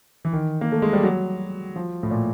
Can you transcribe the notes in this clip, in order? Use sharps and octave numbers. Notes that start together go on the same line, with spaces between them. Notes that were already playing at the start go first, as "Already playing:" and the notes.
E3
D#3
A#3
A3
G#3
G3
F#3
F3
A2
A#2